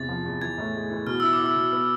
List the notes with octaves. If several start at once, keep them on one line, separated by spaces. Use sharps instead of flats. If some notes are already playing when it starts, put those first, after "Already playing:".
Already playing: E2 C3 A6
F3
E2
E3 G#6
A2
G#3
E3
B2 F6
E4 E6
D6
E4
E6
B2
B3